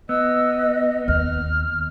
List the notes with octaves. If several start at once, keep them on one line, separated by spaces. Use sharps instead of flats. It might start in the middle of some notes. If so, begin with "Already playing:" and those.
B3 D#5 E6
D#2 F6